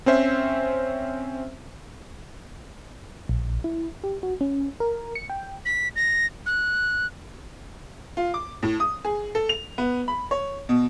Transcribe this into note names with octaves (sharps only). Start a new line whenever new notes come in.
C4 C#4 C5 E5
A#1
E4
G4
F#4
C#4
A#4
C#7
G5
B6
A#6
F#6
F4
D6
A2
D#6
G#4
A4
F7
B3
B5
C#5
B2